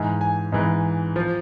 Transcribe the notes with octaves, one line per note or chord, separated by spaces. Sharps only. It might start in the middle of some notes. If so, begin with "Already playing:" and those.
Already playing: G#2 E3 G#5
G#5
G#2 E3
F3